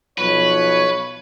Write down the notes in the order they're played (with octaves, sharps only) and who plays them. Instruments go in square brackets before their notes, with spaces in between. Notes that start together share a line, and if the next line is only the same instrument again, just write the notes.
[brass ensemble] B1 F3 C#5 [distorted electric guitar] B4